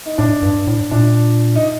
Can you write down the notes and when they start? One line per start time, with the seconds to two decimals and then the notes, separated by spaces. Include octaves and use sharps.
0.06 D#4
0.18 A2 D4
0.43 G2
0.67 A2
0.91 A#2 D4
1.56 D#4